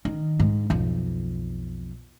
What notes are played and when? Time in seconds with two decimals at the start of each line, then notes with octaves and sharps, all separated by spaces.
0.05 D#3
0.39 G#2
0.70 B1 F2